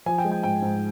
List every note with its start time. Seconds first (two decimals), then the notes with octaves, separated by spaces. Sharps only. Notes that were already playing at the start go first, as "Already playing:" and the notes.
0.06 F3 G#5
0.18 G5
0.25 G#3
0.32 G5
0.43 G#2 G5
0.62 G#2